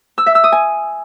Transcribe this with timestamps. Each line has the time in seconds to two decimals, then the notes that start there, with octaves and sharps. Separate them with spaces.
0.18 E6
0.26 E5
0.35 E6
0.44 D#6
0.52 G#5